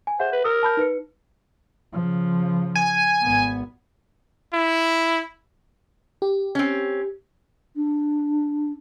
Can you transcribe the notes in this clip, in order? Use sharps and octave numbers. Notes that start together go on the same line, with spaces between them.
G#5
G#4 C5 E5 F#5
B4
A#4 D#6 E6
A5 B5 G6
D#4 B4 C#7
C#3 F3
G#5
G#1 B3
E4
G4
C4 C#4
D4